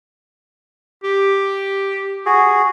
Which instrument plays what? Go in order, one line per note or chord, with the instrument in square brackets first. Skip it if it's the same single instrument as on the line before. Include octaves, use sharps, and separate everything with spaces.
[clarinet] G4
[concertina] F#4 G#4